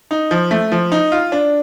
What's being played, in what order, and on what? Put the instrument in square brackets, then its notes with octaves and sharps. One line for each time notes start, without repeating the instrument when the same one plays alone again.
[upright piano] D#4
F3
A3
F3
D#4
F4
D4